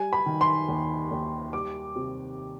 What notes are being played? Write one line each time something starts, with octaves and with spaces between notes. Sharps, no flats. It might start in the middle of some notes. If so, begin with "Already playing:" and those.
Already playing: G3 G#5
B5
D#3
C6
D#2
D#2
G3 D6
C3